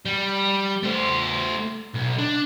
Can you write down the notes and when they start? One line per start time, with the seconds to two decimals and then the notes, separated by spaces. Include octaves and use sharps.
0.06 G3
0.83 A3 C5
1.95 B1
2.18 D4